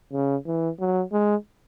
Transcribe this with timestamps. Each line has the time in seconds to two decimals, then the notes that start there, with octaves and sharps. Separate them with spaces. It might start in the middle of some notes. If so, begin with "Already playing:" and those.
0.13 C#3
0.46 E3
0.80 F#3
1.13 G#3